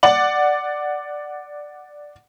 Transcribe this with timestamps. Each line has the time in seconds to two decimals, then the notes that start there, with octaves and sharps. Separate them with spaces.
0.03 D5 F#5 F#7